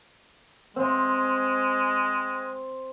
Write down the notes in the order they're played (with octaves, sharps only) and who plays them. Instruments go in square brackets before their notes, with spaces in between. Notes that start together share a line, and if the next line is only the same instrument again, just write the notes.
[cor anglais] G#3 [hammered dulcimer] C4